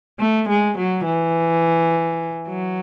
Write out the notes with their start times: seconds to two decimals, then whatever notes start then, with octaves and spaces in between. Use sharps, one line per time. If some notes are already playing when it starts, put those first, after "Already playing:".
0.19 A3
0.48 G#3
0.77 F#3
1.05 E3
2.48 F#3